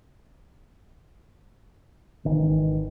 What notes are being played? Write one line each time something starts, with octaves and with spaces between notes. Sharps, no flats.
G#1 D#3 E3